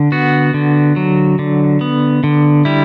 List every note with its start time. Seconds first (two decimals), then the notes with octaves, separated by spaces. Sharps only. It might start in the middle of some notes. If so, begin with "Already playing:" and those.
Already playing: D3
0.12 B3 F#4
0.54 D3
0.96 F#3
1.39 D3
1.81 B3
2.24 D3
2.65 G3 E4